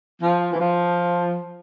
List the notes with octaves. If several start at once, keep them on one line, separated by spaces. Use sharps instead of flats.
F3
E3
F3